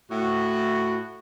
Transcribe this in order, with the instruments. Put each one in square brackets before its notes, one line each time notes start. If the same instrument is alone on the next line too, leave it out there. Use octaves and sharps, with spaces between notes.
[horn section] A2 F#4